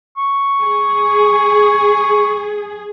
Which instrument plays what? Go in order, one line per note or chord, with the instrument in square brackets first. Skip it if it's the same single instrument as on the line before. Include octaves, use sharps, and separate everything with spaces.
[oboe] C#6
[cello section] G#4